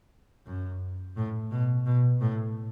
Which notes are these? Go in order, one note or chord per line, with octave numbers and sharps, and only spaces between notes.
F#2
A2
B2
B2
A2